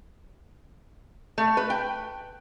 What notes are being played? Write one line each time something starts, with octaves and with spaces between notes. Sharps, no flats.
A3
B4
G5